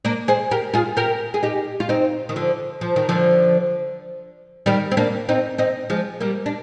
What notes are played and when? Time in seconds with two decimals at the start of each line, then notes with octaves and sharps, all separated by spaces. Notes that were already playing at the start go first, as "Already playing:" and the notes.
0.05 A#3 D4
0.28 G#4 C5
0.51 G4 A#4
0.74 F4 G#4
0.97 G4 A#4
1.34 G#4
1.43 D#4 G4
1.80 F4
1.89 C4 D#4
2.29 D#3
2.36 D3 F3
2.81 F3
2.96 D#3
3.09 D3 F3
4.66 D#3 G3
4.91 C4
4.97 A#3 D4
5.29 C4 D#4
5.58 C4 D#4
5.90 F3 G#3
6.21 G3 A#3
6.46 D4